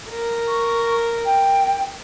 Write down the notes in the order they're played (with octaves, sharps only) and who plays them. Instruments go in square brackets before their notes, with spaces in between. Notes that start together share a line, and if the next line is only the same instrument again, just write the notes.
[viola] A#4
[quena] C#6
G5